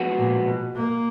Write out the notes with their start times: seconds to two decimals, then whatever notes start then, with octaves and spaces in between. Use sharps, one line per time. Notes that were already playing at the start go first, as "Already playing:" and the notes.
Already playing: F3 G#3 B3 F#4
0.19 A#2
0.47 B2
0.75 A#3